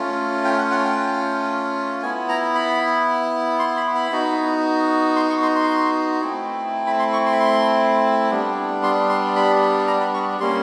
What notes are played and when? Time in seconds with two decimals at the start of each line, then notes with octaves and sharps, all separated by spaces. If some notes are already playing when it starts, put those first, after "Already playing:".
Already playing: A3 C#4 F4
0.45 G5
0.58 F#5
0.71 F#5
0.85 G5
2.03 B3 E4 G#5
2.29 A#5
2.55 B5
3.59 C6
3.77 B5
3.95 B5
4.11 B3 D#4 F#4
5.16 C6
5.30 C#6
5.42 C6
5.55 C6
6.21 A3 C4 E4
6.87 B5
6.99 C6
7.13 C#6
7.26 C6
7.33 B5
7.40 C6
8.31 G3 B3 D4
8.83 C6
9.09 C6
9.36 B5
9.87 A#5
10.01 B5
10.14 C#6
10.40 G3 A#3 C#4 C6